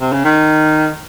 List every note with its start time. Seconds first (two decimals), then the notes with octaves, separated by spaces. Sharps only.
0.01 C3
0.13 C#3
0.25 D#3